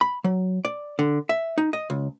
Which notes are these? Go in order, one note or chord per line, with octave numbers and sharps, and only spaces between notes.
B5
F#3
D5
D3
E5
D#4
D#5
C#2